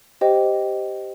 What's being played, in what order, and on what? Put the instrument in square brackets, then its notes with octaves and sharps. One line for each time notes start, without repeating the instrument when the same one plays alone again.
[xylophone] G4 C5 D#5 G5